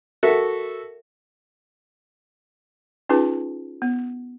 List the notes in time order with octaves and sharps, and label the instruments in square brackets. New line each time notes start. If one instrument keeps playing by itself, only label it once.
[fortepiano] F#4 A4 E5 [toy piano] A#4
[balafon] C#4 D#4 F4 G#4 B4 A5
B3